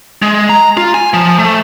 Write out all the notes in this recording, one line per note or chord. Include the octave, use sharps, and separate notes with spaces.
G#3
A#5
F4
G#5
F3
A3